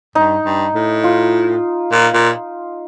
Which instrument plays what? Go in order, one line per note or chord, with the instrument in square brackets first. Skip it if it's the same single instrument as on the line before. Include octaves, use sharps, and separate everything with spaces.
[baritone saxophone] G2 [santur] D#4
[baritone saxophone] G2
A2
[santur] F4
[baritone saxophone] A#2
A#2